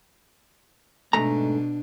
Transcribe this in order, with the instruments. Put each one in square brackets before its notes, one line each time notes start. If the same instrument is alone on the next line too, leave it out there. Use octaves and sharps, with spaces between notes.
[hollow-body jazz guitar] G#2 A3 A#5 [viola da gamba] B2 D4